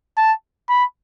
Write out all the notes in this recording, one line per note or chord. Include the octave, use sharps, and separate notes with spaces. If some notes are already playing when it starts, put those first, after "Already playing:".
A5
B5